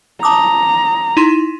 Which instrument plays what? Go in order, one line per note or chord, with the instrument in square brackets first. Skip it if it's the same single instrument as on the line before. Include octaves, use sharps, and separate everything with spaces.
[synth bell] A5 D6 D#6 [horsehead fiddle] A#5
[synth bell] D#4 E4 C6